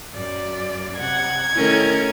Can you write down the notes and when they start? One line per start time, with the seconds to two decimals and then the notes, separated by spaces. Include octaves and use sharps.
0.13 F#2 D5
0.99 C3 F#5 G#6
1.55 D#3 A3 C#4 E4 A4 A#4